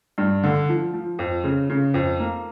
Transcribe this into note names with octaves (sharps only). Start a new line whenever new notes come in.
G2
D3
F3
F3
F2
C#3
C#3
F2
A#3